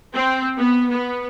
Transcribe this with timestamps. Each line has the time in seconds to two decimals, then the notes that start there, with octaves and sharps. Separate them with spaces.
0.13 C4
0.57 B3
0.89 B3